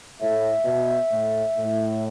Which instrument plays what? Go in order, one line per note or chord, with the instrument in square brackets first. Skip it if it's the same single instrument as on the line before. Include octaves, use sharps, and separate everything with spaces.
[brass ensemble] A2 [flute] E5
[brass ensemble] B2
A2
A2